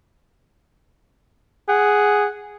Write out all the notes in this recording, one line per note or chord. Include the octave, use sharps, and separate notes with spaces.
G#4 F#5